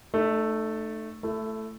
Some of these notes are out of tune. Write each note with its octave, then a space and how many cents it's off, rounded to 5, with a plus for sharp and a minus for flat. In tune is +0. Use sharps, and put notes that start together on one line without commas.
A3 +0 D#4 -40
A3 +0 E4 +30